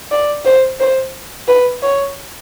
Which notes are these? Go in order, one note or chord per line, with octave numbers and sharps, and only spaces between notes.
D5
C5
C5
B4
C#5